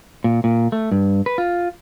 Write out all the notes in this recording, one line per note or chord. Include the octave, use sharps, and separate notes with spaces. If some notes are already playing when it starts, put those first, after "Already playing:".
A#2
A#2
A3
G2
B4
F4